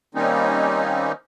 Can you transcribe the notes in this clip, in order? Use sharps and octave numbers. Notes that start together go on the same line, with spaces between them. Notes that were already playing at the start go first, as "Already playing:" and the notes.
D#3 G3 A#3 C4 C#4 D#4